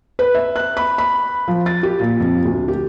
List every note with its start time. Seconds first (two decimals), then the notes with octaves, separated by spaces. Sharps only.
0.19 B4
0.35 E5
0.56 F#6
0.77 B5
0.98 B5
1.48 F3
1.66 A6
1.83 G4
2.00 A#2
2.20 F2
2.45 D2
2.68 G4